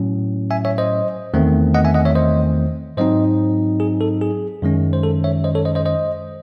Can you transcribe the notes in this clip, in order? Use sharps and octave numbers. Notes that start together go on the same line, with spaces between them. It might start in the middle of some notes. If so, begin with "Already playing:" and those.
Already playing: A2 F#3 C#4
E5 G#5
C#5 E5
C5 D#5
E2 D#3 A3 C4
D#5 F#5
E5 G#5
D#5 F#5
C#5 E5
C5 D#5
G#2 F#3 C4 D#4 C5 D#5
G#4
A4
G#4
F#2 D#3 G#3 C#4
C5
A4
C#5 E5
C5 D#5
A4 C#5
C5 D#5
C5 D#5
C5 D#5